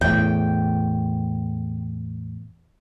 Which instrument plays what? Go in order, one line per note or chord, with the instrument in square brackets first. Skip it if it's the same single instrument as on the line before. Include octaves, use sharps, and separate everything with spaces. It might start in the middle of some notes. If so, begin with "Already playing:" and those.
[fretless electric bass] E2 A2 [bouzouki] G5